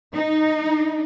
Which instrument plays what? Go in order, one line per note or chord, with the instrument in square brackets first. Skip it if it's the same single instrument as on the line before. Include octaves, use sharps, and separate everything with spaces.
[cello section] D#4